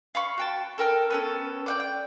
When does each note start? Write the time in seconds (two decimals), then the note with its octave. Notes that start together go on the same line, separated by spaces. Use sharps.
0.15 F5 B5 C#6
0.38 F#4 G5 A5
0.78 A4 A#4 G5 F6
1.10 B3 C#4 A4
1.66 D5 F#5 G5
1.80 G5